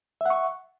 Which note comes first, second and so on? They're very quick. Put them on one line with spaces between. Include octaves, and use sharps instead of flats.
E5 F#5 C#6